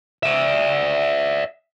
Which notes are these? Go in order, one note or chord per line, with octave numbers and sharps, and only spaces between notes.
D5 E5